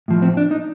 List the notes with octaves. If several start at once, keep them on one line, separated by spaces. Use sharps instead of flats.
A2 F3
C4
D4
D#4